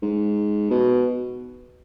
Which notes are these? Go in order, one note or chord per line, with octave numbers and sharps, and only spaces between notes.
G#2
B2